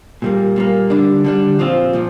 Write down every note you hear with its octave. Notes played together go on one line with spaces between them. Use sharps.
A#2 G3 A#3
A#2 G3 A#3
D3 G3 D4
D3 G3 D4
A#2 F3 C4 F4
A#2 F3